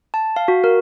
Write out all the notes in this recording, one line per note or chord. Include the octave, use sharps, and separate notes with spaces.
A5
F5
F#4
A#4